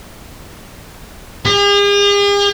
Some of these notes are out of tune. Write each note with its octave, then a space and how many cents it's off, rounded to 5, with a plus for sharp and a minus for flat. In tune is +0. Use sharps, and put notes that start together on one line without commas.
G#4 -45